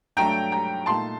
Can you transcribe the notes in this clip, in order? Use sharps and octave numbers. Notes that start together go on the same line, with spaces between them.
G2 F#3 A3 D4 G5 A#5
G5 A#5
A#2 A3 D#4 A5 C6